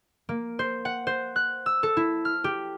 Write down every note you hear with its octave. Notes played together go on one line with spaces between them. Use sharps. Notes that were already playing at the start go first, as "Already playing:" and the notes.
A#3
C5
F#5
C5
F#6
E6
A4
E4
F6
G4